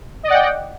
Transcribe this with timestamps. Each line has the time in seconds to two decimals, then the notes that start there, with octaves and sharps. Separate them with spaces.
0.23 D#5
0.27 D5
0.30 F#5
0.34 G5